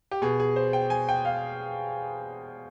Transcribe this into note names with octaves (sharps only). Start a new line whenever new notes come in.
G4
B2 G#4
G#4
C5
G5
G#5
G5
F5